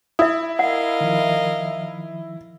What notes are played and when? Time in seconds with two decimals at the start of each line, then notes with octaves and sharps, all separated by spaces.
0.19 E4 E5 D#6
0.59 A#4 D#5 F5 F#5
1.01 D#3 F3